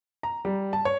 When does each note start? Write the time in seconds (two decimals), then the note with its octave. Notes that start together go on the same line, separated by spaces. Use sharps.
0.23 A#5
0.45 G3
0.73 A5
0.85 C#5